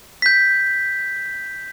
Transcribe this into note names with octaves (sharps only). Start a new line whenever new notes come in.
G6 B6